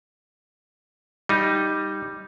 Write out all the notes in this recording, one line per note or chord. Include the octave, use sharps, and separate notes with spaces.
G3 D#4